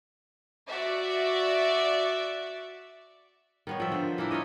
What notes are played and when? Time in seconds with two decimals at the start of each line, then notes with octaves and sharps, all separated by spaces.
0.68 F#4 D5 E5
3.67 D#3 B3 C#5
3.80 F3 E5
3.92 D3 C5
4.18 E3 A#3 D4 E4
4.31 D#4 F4 C#5 D#5